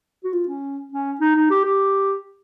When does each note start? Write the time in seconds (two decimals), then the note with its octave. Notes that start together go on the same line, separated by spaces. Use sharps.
0.24 F#4
0.33 F4
0.48 C#4
0.92 C#4
1.21 D#4
1.35 D#4
1.50 G4
1.64 G4